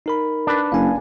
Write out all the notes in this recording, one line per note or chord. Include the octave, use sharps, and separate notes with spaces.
D#4 A#4 B5
D4 B4
F#1 F5 G#5